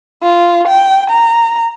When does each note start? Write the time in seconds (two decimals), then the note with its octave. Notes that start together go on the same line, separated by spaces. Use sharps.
0.23 F4
0.67 G5
1.10 A#5